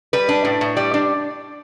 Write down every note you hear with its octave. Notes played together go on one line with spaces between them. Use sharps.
G3 B4
D4
A2
A2
G3 D5
D4